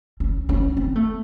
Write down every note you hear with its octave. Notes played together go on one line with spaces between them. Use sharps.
C#4
C#4
C4
A3